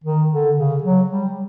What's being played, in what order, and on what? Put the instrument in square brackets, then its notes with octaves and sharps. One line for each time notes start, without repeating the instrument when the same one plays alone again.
[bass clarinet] D#3
D3
C#3
F#3
G3